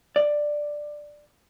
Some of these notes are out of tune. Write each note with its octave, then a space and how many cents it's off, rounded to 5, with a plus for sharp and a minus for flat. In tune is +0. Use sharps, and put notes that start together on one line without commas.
D5 +10